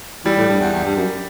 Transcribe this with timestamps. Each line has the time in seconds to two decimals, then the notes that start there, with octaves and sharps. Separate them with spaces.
0.25 E3 G3
0.37 A2
0.48 G2
0.60 E2
0.72 E2
0.84 G2
0.96 F#2